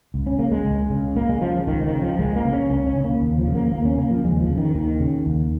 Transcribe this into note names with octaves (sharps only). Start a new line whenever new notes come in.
C#2
C#4
C#3 A#3
G#3
C#2
C#3
C#2 A#3
G#3
C#3 F3
C#2 D#3
D#3
C#3
F3
C#2 G#3
A#3
C#3
C#4
C#2 C#4
C#4
C#3
A#3
D#2
F3
C#3
A#3
D#2 A#3
C#4
C#3 A#3
F3
D#2 G#3
F3
C#3
D#3
D#2 D#3
C#3
D#2